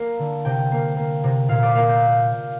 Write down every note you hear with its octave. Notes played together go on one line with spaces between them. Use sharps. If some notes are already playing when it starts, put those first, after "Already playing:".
Already playing: A#3 A#5
D3
C3 G5
A#3
A#3
C3
A#2 F5
D5
A#3 F5
G6